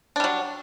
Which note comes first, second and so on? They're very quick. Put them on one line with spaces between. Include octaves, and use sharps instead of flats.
D4 G3 F#3